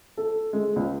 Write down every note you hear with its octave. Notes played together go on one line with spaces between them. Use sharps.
A4
G#3
C#2